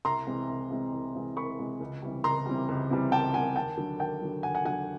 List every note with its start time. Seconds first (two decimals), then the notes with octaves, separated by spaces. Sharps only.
0.05 C2 A#5 C6
0.27 C3 E3 G#3
0.49 C2
0.71 C3 E3 G#3
0.93 C2
1.15 C3 E3 G#3
1.37 C2 B5 C#6
1.59 C3 E3 G#3
1.80 C#2
2.02 C3 E3 G3
2.24 C#2 A#5 C6
2.46 C3 E3 G3
2.68 C#2
2.90 C3 E3 G3
3.12 C#2 G5 A5
3.34 C3 E3 G3 F#5 G#5
3.56 D#2 G5 A5
3.77 D3 F#3
3.99 D#2 G5 A5
4.21 D3 F#3
4.43 D#2 F#5 G#5
4.55 F#5 G#5
4.65 D3 F#3 F#5 G#5